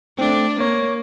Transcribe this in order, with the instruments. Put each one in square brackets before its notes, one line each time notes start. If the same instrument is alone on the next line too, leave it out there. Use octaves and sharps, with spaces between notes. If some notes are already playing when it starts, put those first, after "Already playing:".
[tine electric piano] A3 C4 [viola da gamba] D4
[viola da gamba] A#3 [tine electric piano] C#5